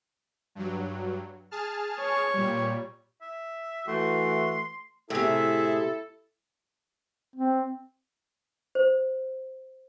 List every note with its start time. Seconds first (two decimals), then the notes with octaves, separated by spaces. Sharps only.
0.55 G2 F#3
1.51 G#4 A5 F6
1.99 C#5
2.34 A#2 G3
3.21 E5
3.88 E3 A3 F#4 C6
5.10 A2 C3 E4 G#4 A4 E5
7.36 C4
8.75 C5